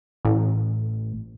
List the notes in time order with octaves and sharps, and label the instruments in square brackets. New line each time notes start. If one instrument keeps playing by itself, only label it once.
[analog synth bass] A1